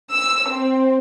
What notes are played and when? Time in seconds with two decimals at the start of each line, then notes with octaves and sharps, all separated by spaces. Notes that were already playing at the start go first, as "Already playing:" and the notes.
0.14 E6
0.49 C4